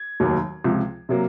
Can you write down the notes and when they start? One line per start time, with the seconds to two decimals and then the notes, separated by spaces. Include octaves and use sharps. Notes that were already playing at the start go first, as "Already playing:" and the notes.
Already playing: G#6
0.20 F1 D#2 D#3 F#3 A#3
0.64 C#2 C3 F3
1.09 C3 F#3 A#3